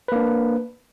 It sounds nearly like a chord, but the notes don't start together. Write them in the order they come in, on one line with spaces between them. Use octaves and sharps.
B4 A#3 D4